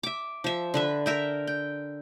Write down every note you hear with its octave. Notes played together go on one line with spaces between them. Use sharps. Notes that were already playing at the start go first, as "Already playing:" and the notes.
E5 D6
F3 E5
D3 B4 E5
A#4 E5 G5
G5